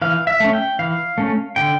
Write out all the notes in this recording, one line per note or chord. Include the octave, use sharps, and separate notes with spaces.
E3 F5
E5
A3 C#4
G5
E3 F5
A3 C#4
D3 G5